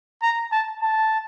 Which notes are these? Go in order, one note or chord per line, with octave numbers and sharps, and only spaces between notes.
A#5
A5
A5